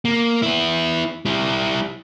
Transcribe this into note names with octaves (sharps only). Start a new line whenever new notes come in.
A#3
B3 E4
G3 E4